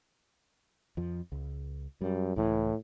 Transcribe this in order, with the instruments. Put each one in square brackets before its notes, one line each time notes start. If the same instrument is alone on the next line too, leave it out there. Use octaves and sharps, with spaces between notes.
[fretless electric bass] F2 F3
C#2
[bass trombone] F#2 [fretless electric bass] G3
[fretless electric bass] C#2 E3 [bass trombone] A2